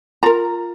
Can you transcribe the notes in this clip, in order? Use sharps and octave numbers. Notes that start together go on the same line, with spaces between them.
F4 A#4 A#5